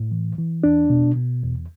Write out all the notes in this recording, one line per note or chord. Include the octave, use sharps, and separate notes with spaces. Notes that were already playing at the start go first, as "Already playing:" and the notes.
Already playing: A2
E3
E3
E2 D4
B2
B2
E2